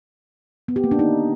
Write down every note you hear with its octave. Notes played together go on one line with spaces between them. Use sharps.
B3
G4
A#3
D4
D#4